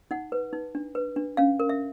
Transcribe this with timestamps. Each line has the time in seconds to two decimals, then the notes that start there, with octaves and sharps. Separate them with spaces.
0.11 D#4 F#5
0.32 B4
0.53 D#4
0.75 D4
0.95 B4
1.16 D4
1.37 C#4 F5
1.60 A#4
1.69 E5